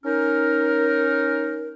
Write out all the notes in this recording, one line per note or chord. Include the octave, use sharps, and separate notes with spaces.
C#4 D#4 A#4